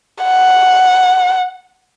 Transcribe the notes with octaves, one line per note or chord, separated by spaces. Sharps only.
F#5